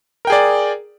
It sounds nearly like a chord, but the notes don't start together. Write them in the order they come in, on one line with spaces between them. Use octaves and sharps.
A#4 G5 G#4 D5